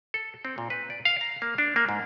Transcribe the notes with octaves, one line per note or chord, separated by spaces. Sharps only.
A4
C4
A#2
B4
D5
F5
A#5
A#3
D4
A#3
G#2